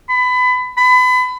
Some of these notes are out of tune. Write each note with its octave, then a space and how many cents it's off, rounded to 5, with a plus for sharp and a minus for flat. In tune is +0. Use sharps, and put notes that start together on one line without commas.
B5 +25
B5 +30